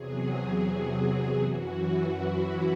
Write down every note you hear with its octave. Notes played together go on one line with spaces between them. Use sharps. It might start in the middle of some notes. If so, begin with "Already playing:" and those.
Already playing: E2 C3 F#3 G#4
F#2 E3 F#4
E4